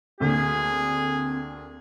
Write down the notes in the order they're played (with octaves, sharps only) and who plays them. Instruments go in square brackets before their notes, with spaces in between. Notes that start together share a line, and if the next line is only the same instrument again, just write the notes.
[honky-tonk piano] D2 D3 A#3 [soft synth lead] C4 [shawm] G#4